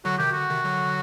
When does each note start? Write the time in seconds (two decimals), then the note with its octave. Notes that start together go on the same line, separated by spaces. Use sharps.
0.05 D3 F#3 F#4
0.18 C3 D#3 G4
0.31 D3 F#4
0.50 C3 D#3
0.65 D3 F#3